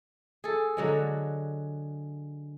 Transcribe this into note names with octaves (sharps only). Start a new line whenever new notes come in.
G#4 A4
D3 F#3 G#3